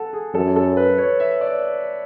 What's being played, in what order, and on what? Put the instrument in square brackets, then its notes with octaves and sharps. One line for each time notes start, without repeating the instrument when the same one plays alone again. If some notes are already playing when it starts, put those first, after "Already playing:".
Already playing: [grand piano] A4 F#5
G#4
[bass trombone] F#2 [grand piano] A4
[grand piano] A4
B4
C#5
E5
D5